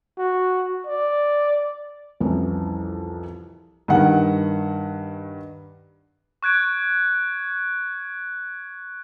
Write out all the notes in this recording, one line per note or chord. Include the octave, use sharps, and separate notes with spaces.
F#4
D5
C2 F2 E3 C#4 E4
G2 D#3 F#5
C#6 F#6 G#6 D7